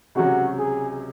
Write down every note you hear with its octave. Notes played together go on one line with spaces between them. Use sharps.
C#2 C3 F#3 C#4 F#4
G#4